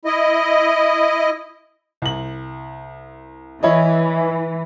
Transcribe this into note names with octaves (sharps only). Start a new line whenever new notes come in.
E4 D#5
C2 F#7
E3 E4 C#5 D#5